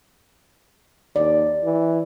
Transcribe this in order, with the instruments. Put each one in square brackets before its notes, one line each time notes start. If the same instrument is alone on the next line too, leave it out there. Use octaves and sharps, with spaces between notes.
[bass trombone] D#2 [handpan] D5
[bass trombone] E3